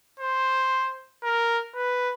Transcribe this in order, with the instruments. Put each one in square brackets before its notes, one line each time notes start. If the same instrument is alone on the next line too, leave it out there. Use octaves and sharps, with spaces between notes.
[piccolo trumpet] C5
A#4
B4